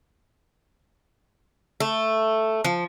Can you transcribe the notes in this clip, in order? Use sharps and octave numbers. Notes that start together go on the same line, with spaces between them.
A3
F3